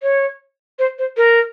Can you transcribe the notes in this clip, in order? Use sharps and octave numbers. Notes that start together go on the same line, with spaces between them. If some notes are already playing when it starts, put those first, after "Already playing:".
C#5
C5
C5
A#4